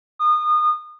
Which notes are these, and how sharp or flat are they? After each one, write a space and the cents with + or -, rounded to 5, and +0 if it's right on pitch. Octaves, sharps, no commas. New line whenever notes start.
D#6 -30